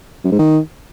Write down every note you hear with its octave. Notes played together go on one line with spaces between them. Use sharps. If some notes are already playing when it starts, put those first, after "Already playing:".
F#2
G#2
D#3